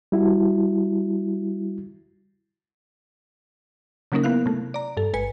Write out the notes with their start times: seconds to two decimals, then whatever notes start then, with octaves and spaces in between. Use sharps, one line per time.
0.12 G3 E4 F#4
4.12 C#3 F#3 A#3 C#4 D#4 A#4
4.23 B3 E4 F5 F#6
4.46 C3 A3
4.74 D5 A#5
4.97 G2 A4
5.13 G#1 B4 G#5 C#7